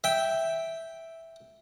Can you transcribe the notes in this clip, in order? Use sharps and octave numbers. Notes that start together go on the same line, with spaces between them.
E5 G5